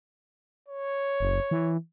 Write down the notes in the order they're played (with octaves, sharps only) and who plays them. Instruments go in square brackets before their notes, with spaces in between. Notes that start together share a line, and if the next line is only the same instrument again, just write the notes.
[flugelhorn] C#5
[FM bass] F#1
E3